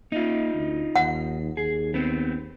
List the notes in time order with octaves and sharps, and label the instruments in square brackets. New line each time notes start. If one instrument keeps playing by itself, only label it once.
[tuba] A#3 [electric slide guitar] D#4 F4
[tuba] D2
[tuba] D#2 [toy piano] F#5
[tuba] D#2 [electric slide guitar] G#4
[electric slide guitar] B3 C4